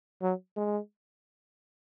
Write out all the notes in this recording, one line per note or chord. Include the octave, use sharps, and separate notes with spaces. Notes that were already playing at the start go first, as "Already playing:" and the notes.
F#3
G#3